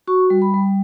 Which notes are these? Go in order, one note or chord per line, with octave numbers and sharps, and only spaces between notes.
F#4 C#6
G3
B5
G3